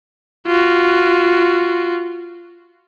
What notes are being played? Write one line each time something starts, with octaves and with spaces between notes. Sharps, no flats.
F4 F#4